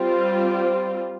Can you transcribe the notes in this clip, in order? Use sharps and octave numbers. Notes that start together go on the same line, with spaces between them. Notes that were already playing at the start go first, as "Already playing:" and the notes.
Already playing: G3 C4 F4